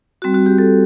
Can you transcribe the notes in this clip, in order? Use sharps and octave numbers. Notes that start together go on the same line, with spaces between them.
G3 C4 F#4
F#4
G4
A4